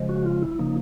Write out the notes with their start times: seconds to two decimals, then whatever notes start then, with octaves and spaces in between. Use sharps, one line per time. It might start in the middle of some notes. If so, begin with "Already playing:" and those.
Already playing: C#3 F3 G#3
0.09 F#4
0.25 F4
0.42 E4
0.59 C#3 F3 A#3 D#4